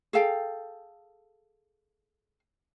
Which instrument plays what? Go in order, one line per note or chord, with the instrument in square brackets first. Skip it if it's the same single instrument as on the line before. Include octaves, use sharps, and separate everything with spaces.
[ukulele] G#4 A4 F5 G5